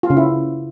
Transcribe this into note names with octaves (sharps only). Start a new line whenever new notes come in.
F4
C#3
E4